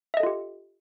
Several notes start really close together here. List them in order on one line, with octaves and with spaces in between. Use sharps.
E5 D#5 A4 F4 G4